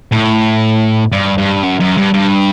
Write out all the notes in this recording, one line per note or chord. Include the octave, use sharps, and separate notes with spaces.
A2
G2
G2
F#2
F#2
G2
G2